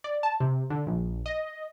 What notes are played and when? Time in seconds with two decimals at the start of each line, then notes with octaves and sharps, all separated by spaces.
0.04 D5
0.23 A5
0.40 C3
0.70 D3
0.87 A#1
1.26 D#5